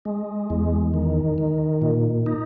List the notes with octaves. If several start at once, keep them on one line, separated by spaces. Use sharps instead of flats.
G#3
E2
D#3
D#3
A#2
D#4